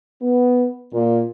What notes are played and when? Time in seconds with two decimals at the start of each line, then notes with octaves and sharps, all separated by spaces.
0.22 B3
0.94 A#2